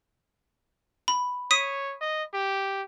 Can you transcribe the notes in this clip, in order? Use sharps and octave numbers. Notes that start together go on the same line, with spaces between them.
B5
C#5 D#6 B6 D#7
D#5
G4